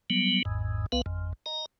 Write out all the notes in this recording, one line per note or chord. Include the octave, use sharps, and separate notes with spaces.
F#3 G3 B3
G#1 E2 G#2
C2 B3 B4 F5
G#1 F2
D#5 A#5